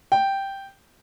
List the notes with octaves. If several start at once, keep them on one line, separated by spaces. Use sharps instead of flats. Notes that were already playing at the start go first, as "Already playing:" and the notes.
G5